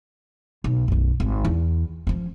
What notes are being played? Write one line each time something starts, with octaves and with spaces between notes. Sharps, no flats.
B1
B1 F#2
G#1
E2
F3 C#4